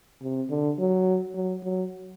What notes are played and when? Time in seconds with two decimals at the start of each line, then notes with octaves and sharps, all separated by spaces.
0.22 C3
0.50 D3
0.79 F#3
1.35 F#3
1.64 F#3